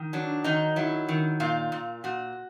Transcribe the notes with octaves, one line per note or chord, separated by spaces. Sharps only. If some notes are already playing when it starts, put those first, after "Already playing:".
Already playing: D#3
F#3 D4
D#3 D#4
F#3 E4
D#3
A#2 F4
A#2
A#2 F#4